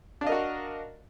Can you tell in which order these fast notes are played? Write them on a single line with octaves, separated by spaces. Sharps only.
D4 F5 D#5 A#4 F#4